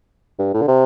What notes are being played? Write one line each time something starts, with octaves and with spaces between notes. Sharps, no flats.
G2
A2
D3
C3